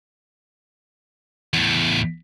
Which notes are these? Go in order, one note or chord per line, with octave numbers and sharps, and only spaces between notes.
E2 A2